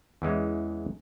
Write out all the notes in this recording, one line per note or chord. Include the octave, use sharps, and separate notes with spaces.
E2 E3 G#3 C#4